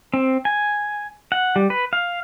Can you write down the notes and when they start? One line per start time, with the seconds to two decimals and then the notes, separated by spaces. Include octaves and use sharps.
0.14 C4
0.45 G#5
1.32 F#5
1.56 G3
1.70 B4
1.93 F5